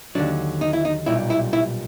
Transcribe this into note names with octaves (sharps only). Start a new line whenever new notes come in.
D#2 D3 F#3 D4
D#4
E4
D#4
B1 A#2 G3 E4
E4
E4